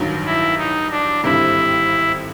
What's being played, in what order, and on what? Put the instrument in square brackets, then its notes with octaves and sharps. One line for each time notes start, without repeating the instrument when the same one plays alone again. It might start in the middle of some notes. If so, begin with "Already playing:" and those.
Already playing: [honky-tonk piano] A1 G2 D#3 F#3
[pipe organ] E4
D#4
D4
[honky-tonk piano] G#1 G2 D3 G3 C4 [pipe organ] E4